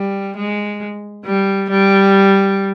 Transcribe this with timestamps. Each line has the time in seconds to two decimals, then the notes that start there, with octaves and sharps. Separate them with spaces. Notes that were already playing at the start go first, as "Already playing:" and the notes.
Already playing: G3
0.37 G#3
1.25 G3
1.70 G3